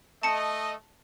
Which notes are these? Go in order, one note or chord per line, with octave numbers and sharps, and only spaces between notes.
A3 D#5 A5 C#7